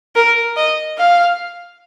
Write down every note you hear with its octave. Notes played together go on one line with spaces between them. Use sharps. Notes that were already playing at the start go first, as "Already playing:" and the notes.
A#4
D#5
F5